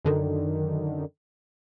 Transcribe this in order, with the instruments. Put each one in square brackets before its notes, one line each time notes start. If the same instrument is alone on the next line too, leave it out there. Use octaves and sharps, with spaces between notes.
[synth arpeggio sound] F#2 D3 D#3